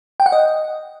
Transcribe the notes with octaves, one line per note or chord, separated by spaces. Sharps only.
G5
F#5
D#5